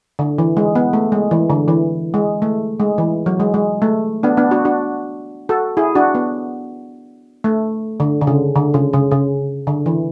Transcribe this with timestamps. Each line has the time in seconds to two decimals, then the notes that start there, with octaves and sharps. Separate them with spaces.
0.19 D3
0.38 E3
0.57 G#3
0.76 B3
0.93 A3
1.12 G#3
1.31 E3
1.50 D3
1.68 E3
2.14 G#3
2.42 A3
2.80 G#3
2.98 E3
3.26 F#3
3.40 G#3
3.54 G#3
3.82 A3
4.23 B3 D4
4.37 B3 D4
4.51 D4 F#4
4.65 D4 F#4
5.49 F#4 A4
5.77 E4 G#4
5.95 D4 F#4
6.15 B3
7.44 A3
8.00 D3
8.21 D3
8.27 C#3
8.55 D3
8.74 C#3
8.93 C#3
9.11 C#3
9.67 D3
9.86 E3